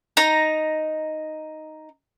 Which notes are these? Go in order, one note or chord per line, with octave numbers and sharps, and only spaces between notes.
D#4 A#5